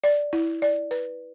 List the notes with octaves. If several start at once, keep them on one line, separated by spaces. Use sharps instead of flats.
D5
E4
D5
B4